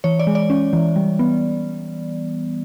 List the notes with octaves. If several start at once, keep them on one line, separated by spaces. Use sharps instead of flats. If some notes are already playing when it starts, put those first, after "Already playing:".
E3 C#5
D5
G#3
D5
C#4
E3
G3
B3